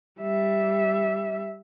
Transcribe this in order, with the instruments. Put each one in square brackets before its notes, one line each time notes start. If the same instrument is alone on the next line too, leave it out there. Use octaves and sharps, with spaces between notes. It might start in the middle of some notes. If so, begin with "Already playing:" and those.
[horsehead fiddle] G3 E5